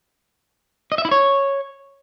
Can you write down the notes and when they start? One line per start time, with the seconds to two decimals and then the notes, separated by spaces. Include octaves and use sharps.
0.92 D#5
0.98 E5
1.05 E4
1.11 C#5